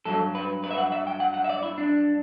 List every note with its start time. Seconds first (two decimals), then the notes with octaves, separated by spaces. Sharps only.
0.05 G2 F#3 A4
0.35 B4
0.64 B4
0.71 E5
0.78 F#5
0.92 E5
1.07 G5
1.20 F#5
1.34 F#5
1.44 E5
1.49 D5
1.63 E4
1.78 D4